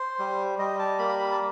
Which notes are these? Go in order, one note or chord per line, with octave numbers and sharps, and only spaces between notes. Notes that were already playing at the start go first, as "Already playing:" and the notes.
Already playing: C5
G3
G3 D#5
A5
A#3 B5
B5
A5